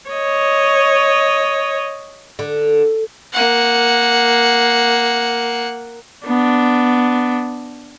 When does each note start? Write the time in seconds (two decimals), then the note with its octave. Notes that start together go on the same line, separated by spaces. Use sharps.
0.10 C#5 D#5
2.39 D3
3.33 A#3 F#5
6.26 B3 D4